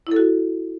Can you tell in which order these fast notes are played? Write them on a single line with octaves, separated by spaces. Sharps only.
E4 A4 F#4